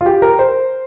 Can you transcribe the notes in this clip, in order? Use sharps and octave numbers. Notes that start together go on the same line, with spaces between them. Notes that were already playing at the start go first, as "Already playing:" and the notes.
F4
G4
A#4
C5